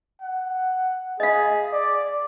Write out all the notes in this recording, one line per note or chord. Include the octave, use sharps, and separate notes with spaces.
F#5
G#4 D#5 F5
D5